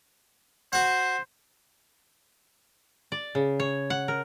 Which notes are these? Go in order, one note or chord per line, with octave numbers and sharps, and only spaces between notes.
F#4 C5 F#5
D5
C#3
C#5
F#5
A#4